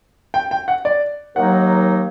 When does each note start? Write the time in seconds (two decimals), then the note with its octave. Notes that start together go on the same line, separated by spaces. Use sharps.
0.34 G5
0.51 G5
0.68 F#5
0.85 D5
1.36 D#2 D#3 F#3 A#3 D#4 F#5